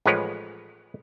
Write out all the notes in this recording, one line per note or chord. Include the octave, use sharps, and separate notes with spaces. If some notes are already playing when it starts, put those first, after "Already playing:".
A1 F3 G#3 B4 C#5 F#5